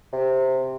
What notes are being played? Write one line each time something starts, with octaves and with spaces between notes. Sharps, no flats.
C3